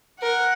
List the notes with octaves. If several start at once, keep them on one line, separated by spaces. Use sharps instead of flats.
A#4 F#5